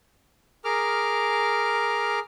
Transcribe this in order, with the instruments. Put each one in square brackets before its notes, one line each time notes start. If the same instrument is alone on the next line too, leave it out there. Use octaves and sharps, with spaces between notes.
[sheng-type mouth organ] G#4 A#4 D6 F6